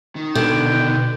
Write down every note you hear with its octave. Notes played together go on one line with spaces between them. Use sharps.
D#3
B2 D3 G5